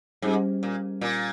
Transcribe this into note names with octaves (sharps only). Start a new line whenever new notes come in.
G#2 G3 C#4 G4 C5
A#2
A#2